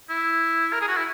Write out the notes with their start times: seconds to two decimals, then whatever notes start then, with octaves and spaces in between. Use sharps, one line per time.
0.10 E4
0.73 A#4
0.81 G#4
0.88 F#4
0.97 E4